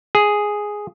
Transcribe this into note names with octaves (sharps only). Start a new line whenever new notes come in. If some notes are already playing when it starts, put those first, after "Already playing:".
G#4